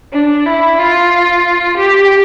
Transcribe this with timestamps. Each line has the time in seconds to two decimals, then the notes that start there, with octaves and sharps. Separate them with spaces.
0.13 D4
0.46 E4
0.79 F4
1.77 G4